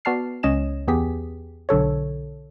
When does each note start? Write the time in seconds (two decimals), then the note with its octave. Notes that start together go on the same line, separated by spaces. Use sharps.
0.05 B3 F#4 D5 A5 F6 C7
0.43 C#2 C#4 D#5 G#5 E7
0.88 E2 B3 G4 G#4 B6
1.69 B1 D3 A4 C#5